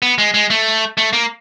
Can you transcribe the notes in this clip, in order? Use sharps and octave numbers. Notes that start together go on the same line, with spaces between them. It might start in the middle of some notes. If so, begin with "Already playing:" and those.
B3
G#3
G#3
A3
A3
A#3